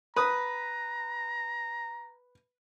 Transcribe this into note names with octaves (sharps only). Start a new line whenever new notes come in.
B4 A#5 B5 D#6